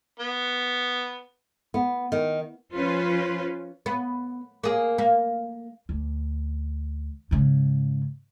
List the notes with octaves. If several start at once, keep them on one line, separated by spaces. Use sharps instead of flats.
B3
B3
D#3
F3 C#4 F4 B4 C5
B3
A#3 G#4
A#3
D2
G#2 C#3